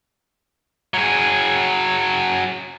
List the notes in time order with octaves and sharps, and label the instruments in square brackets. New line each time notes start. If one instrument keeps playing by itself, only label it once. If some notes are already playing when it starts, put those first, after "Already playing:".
[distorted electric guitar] F#3 G#4